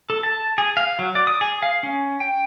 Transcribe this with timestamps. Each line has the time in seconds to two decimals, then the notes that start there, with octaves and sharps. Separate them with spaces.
0.10 A4
0.23 A5
0.58 G#4
0.77 F5
0.99 F#3
1.15 D5
1.27 D#6
1.41 G#4
1.62 F5
1.83 C#4
2.20 G5